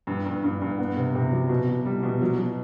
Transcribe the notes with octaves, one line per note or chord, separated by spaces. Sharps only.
G2
G2
G2
G2
B3
C3
C3
F#3
B2
B2
G3
B2
F#3
F#3